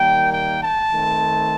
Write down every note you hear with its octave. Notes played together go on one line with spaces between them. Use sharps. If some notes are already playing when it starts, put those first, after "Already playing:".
Already playing: D#3 G3 A#3 G5
G5
A5
D#3 A3 C4